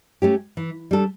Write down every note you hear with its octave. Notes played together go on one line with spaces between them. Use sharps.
A3 C#4 G4
E3
G3 D4 A4